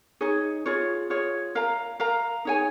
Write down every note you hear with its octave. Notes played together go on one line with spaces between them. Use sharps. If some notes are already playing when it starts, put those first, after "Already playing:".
D#4 G#4 C#5
F4 G#4 C#5
F4 G#4 C#5
A#4 F5 A#5
A#4 F5 A#5
D#4 G#4 C#5 G#5